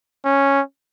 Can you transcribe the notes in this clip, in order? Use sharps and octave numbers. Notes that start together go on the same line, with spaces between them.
C#4